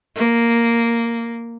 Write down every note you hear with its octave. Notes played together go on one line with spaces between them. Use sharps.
A#3